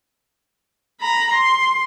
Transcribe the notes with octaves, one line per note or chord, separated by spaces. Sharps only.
A#5 B5
C6